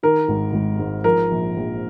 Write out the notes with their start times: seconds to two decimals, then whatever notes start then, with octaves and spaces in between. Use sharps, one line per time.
0.03 D#3 A#4
0.29 G#1
0.53 G#1
0.79 G#2
1.04 F3 A#4
1.31 A#1
1.56 A#1